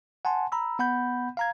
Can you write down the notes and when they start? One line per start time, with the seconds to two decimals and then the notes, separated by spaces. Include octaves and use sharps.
0.25 F#5 G#5 A5 C6
0.52 A#5 B5 E6
0.79 B3 F#5 B5 G6
1.37 F5 A#5 G#6